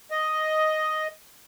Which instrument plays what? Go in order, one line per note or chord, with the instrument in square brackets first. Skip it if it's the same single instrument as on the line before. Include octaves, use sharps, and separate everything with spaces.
[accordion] D#5